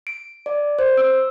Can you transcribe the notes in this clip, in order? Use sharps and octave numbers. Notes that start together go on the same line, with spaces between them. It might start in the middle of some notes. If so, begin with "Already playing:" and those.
D7
D5
C5
E6